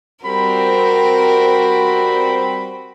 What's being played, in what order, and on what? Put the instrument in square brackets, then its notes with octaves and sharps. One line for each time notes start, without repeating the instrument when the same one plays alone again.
[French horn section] G3 C4 [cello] F#4 [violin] A#4 [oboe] B5